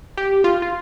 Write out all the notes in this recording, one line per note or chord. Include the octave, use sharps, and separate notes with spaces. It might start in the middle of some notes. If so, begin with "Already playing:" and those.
G4
F4
F4